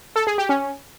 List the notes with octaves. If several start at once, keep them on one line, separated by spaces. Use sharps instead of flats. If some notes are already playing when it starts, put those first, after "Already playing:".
A4
G#4
G4
C#4